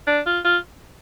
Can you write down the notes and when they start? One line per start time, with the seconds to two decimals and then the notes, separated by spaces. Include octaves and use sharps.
0.07 D4
0.26 F4
0.44 F4